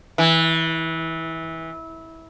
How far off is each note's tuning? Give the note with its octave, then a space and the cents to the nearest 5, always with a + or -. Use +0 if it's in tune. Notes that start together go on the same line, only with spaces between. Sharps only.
E3 -20